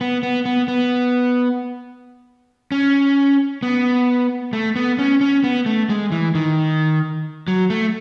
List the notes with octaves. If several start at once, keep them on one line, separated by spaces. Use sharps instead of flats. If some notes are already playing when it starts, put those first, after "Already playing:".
B3
B3
B3
B3
C#4
B3
A3
B3
C#4
C#4
B3
A3
G#3
E3
D#3
F#3
A3